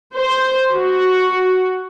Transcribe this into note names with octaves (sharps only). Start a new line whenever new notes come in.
C5
F#4